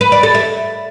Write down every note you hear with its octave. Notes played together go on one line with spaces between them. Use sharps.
B4
D5
A4
E5